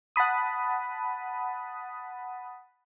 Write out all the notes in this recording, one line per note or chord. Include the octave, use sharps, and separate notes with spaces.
F#5 A5 B5 D#6